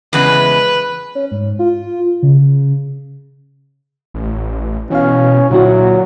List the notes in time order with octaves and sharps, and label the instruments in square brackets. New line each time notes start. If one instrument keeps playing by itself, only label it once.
[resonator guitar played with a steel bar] E2 C#3 G#3 [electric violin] B4
[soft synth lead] C#4
G#2
F4
C#3
[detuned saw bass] A1
[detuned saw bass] B2 [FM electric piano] E3 F5 [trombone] C#4
[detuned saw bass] A#2 [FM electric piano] D3 E4 F#4 [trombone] F#3